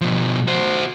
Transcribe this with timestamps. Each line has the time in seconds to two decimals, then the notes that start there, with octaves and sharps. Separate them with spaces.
0.01 B2 F3
0.48 F#4 C5